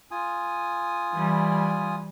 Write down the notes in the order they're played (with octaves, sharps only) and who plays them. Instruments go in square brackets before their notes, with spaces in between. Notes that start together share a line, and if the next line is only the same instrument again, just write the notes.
[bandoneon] F4 G#5 D#6
[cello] E3 G3